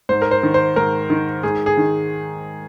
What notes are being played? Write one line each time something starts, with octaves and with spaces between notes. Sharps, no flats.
G#2 C5
A#4
C5
D#3
C5
G#2 A#4
D#3
G#2 G#4
G#4
D#3